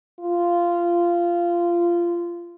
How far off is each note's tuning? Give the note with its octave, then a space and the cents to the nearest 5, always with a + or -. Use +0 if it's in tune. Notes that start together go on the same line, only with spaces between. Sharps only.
F4 -15